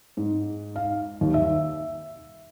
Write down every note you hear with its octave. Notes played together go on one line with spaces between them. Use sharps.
G#2
F5
D#2
E5